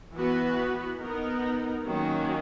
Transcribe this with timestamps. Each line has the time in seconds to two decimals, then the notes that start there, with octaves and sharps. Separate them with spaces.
0.14 E3 B3 F#4 B4
1.00 B3 D#4 A#4
1.86 D#3 F#3 A#3 C#4 F#4